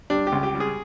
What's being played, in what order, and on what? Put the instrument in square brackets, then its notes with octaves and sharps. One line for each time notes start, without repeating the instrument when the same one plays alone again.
[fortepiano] G3 D4
G4
C#2
G4
G3
G#4